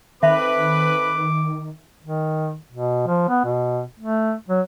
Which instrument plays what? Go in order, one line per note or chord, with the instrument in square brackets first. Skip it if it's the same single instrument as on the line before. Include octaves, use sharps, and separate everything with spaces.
[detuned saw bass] D#3 [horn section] C4 A4 B4 [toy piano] E5 B5 [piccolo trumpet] D6
[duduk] D#3
B2
F3
B3
B2
A3
F#3